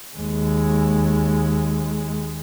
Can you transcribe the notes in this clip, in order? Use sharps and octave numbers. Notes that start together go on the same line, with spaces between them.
D#2 G#3